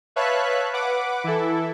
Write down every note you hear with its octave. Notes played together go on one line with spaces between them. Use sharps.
B4 C#5 E5 F5 A5 F#6
B4 F#5 D6
E3 E4 A4